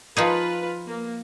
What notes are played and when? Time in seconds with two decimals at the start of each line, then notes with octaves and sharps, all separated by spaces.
0.17 F3 D#4 F4 G#4 B4
0.87 A#3